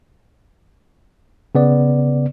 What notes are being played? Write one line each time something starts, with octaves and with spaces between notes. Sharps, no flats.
C#3 B3 D5